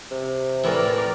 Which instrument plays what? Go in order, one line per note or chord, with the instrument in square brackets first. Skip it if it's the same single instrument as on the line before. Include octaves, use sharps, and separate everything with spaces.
[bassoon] C3
[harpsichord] A2 E3 [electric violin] A#4 D5